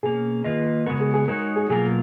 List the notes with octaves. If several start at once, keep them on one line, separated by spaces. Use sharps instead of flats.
B2 A#3 C#4 G#4
D#3 A#3 F4 B4 D#5
C#3 G#3 B3 F#4 A#4
G#4
G#4
G#3 D#4 F#4 A#4 C#5
G#4
B2 F#3 A#3 F4 G#4 A#4